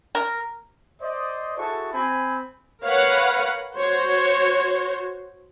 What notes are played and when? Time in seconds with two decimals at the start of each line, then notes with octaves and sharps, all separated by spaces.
0.15 A#4
1.02 C5 D5 D#5
1.58 E4 F#4 G#4 A4 A5 C#6
1.94 C4 G#5 B5
2.83 A#4 B4 C#5 F5 F#5
3.76 F#4 C5 C#5